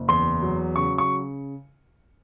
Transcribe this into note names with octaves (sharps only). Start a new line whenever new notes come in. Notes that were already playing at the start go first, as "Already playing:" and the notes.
Already playing: F#1
E2 C6
F#3
C#3 C#6
C#6